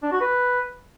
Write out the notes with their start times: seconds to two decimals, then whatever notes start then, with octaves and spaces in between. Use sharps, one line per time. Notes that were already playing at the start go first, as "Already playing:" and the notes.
0.03 D4
0.12 F#4
0.21 B4